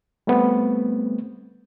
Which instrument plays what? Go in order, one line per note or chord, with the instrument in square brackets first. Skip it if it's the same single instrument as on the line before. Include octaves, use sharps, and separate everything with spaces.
[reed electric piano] G3 A3 B3 C4